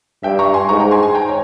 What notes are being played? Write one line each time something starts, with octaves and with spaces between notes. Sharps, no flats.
G2 E5 G5
A#5 C#6
G#5 C6
G#2 A#5 C#6
G5 A#5
G#5 C6
G#5 C6
G5 A#5
C#5